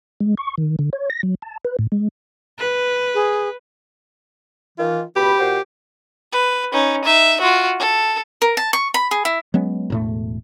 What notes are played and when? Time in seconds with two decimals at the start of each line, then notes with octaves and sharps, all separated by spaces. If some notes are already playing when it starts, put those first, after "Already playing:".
0.20 G#3
0.38 C#6
0.58 D#3
0.79 D3
0.93 C#5
1.10 A#6
1.23 F#3
1.42 A5
1.65 B4
1.79 A2
1.92 G#3
2.59 B4
3.14 G#4
4.78 D#3 E3 F4
5.16 C#2 B2 G4 B5
5.39 A#2 F#4 C5
6.33 B4
6.72 C#4 D#4
7.04 D#4 E5
7.41 F4 F#4
7.80 A4
8.42 A#4
8.57 A5
8.73 C#6
8.94 B5
9.11 G#4
9.25 E4
9.54 F#3 G#3 B3 C#4
9.90 E1 A2 A3